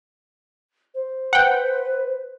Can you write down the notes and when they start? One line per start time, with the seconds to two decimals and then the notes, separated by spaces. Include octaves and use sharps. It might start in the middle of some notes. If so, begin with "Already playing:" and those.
0.95 C5
1.33 B4 F#5 G5